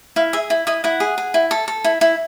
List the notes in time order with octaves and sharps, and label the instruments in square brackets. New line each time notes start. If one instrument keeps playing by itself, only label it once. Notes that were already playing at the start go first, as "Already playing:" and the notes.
[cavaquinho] E4 F5
G#4 E5
E4
E4 D#5
E4 F#5
G#4
G#4
E4
A4
A4
E4
E4